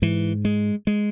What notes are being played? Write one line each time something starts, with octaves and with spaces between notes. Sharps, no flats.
G#2 E3
G#3
G#3